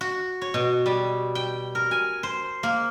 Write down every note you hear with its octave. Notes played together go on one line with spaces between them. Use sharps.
F#4
C#5
B2
G3
G5
A#4
G#5
C5
A#3